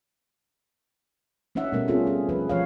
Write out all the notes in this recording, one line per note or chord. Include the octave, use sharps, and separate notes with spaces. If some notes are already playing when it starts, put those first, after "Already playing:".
A3 C#4 D#4 E5 F#5
B2 G3 A3 A#4
C4 C#4 F4 G#4 A4
G#4
F3 C#4 F4 G#4 B4
F3 C#5 F5